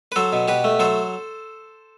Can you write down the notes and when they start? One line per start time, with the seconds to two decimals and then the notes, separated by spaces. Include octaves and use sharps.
0.12 B4
0.16 F#3 A4 C5
0.33 B2
0.48 B2 G4 B4
0.64 A3
0.79 F#3 A4 C5